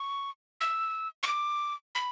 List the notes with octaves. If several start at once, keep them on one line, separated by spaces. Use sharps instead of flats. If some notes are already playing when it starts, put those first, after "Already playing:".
Already playing: C#6
E6
C#6
D6
B5